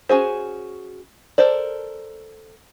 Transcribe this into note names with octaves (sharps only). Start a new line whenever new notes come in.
C#4 F#4 G#4 C5
A4 A#4 C5 D5